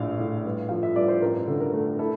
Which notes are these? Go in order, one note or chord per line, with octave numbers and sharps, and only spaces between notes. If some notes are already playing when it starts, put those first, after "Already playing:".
Already playing: A#1 A2 F5
A2
G2
F3 F5
E5
G2 D5
C5
A1 A#4
D3
A#4
A3
E4 A4